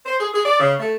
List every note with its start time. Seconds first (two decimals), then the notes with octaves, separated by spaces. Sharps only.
0.06 C5
0.19 G#4
0.34 G#4
0.46 D5
0.60 C#3
0.79 A3